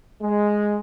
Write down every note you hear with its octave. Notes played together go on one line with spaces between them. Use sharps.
G#3